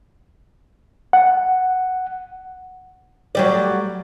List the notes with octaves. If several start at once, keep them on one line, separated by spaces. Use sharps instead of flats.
F#5
F#3 G3 D5